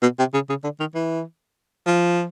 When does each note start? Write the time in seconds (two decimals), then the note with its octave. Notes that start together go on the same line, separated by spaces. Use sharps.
0.02 B2
0.19 C3
0.34 C#3
0.49 C#3
0.64 D3
0.80 D#3
0.95 E3
1.87 F3